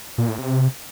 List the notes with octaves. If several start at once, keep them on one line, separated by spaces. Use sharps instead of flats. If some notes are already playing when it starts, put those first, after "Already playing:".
A#2
A2
C3